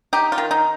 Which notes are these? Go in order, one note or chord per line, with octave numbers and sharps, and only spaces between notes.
D#4 G4
F4
D#3
D#4